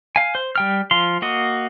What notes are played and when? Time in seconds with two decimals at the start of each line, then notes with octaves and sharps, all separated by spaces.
0.16 F5 G#5
0.35 C5
0.56 G3 G5 F6
0.91 F3 F5 C6
1.22 A#3 F#4 D#5